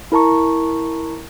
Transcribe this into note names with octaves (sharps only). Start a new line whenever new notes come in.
E4 A#4 A5 A#5 C#6